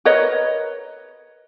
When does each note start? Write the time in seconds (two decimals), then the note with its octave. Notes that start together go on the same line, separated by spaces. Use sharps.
0.05 A#4 B4 C#5 D#5